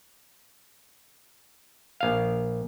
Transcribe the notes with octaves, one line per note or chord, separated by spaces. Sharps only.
A#1 F5